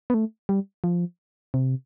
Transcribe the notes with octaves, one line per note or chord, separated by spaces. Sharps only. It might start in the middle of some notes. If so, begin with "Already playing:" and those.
B3
A3
G3
F3
C3